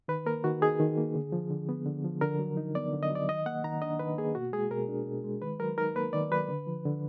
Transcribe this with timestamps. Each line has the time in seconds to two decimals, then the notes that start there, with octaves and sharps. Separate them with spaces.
0.08 D#3 B4
0.26 A#3 A#4
0.44 D#3 F#4
0.62 D#4 G#4
0.80 D#3
0.97 A#3
1.15 D3
1.32 F3
1.50 D3
1.69 B3
1.86 D3
2.04 F3
2.21 D3 A#4
2.39 F#3
2.57 D#4
2.75 B3 D5
2.93 D3
3.03 D#5
3.11 F#3 D5
3.28 D#3 D#5
3.46 A#3 F#5
3.64 D#3 A#5
3.82 D4 D#5
3.99 D#3 B4
4.18 A#3 G#4
4.35 B2 F#4
4.53 G#3 G#4
4.71 B2 A#4
4.89 D4
5.06 B2
5.24 G#3
5.42 D#3 B4
5.59 F#3 A#4
5.77 D#4 A#4
5.95 A#3 B4
6.13 D#3 D5
6.31 F#3 B4
6.48 D3
6.67 F3
6.85 D3